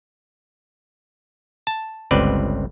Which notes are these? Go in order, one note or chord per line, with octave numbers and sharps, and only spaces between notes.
A5
G1 C#2 C4 B4 D5